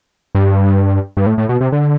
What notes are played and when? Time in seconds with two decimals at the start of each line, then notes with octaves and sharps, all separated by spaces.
0.35 G2
1.17 G2
1.26 A2
1.38 A2
1.49 B2
1.61 C3
1.72 D3